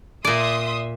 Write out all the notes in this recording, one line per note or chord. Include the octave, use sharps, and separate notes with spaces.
A#2 D5 E5 C6 D#6